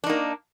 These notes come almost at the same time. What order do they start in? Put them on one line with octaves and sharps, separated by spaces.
D4 D#4 A#3